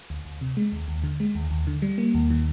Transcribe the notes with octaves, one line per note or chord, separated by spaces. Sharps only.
D2
D2
C3
G#3
D#2
D#2
D3
G#3
D#2
D#2
D3
G3
A#3
D#2
D#3